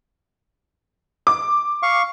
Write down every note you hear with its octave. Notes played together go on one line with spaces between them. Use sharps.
D6
F5 C#6